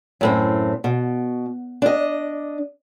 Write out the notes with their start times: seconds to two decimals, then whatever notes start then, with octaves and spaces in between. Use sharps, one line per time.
0.21 F#2 A2 C4
0.84 B2
1.82 D4 D#5